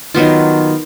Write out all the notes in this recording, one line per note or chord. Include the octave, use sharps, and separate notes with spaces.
D#3 F#3 B3 F4